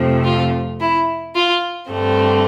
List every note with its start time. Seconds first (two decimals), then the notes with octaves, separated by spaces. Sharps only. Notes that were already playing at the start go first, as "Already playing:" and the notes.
Already playing: F2 C3 F3 A3
0.24 F4
0.80 E4
1.35 F4
1.91 G2 D3 A3 C4